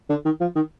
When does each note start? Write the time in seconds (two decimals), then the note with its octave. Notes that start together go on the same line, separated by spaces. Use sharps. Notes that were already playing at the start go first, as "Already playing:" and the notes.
0.10 D3
0.25 D#3
0.41 F3
0.56 D#3